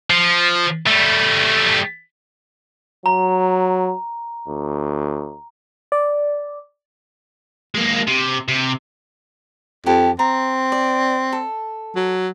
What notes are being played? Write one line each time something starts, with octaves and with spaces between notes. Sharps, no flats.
F3
G3 A3
F#3 A#5
D2
D5
G#3 A#3
C3
C3
F2 G4 A4
C4 A#5
D5
A4
F#3